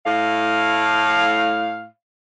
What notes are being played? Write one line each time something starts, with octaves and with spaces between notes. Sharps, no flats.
A2 F5